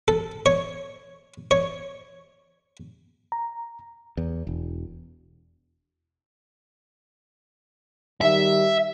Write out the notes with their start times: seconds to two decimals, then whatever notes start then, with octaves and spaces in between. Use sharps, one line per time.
0.08 A4
0.46 C#5
1.51 C#5
3.32 A#5
4.17 E2
4.47 E1
8.21 D#3 G3 E5